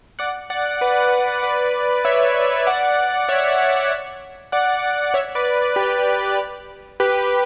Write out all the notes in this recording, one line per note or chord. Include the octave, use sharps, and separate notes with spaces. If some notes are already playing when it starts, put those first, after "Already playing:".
D5 F#5
D5 F#5
B4 D5
B4 D5
C#5 E5
D5 F#5
C#5 E5
D5 F#5
C#5 E5
B4 D5
G4 B4
G4 B4